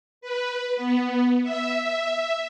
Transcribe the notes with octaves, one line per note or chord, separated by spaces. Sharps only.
B4
B3
E5